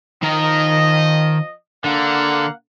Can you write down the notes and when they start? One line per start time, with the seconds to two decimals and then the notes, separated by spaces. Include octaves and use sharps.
0.23 D#3 F3 A#4 D#5
1.84 D3 A#3 F5 F#5